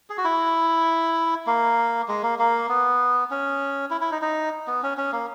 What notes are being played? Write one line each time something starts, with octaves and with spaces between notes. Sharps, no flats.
G#4
F#4
E4
A#3
G#3
A#3
A#3
B3
C#4
E4
E4
D#4
D#4
B3
C#4
C#4
A#3